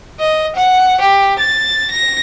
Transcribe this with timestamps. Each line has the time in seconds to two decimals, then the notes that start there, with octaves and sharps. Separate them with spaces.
0.20 D#5
0.56 F#5
1.00 G4
1.39 A6
1.91 A#6